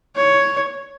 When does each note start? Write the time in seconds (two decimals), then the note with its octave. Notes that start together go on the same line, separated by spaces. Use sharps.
0.16 C#5